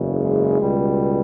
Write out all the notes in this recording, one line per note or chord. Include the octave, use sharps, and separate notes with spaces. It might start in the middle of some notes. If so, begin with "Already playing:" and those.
Already playing: F#1 E2 C#3
G#3
C#2 B2 G3